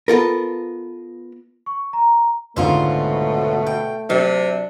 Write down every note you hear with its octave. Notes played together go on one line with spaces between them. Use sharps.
B3 F4 A4 A#4
C#6
A#5
C#2 G#2 B2 D3 A3 C#4 F4 C5
G5
C3 F#3 D4 D#5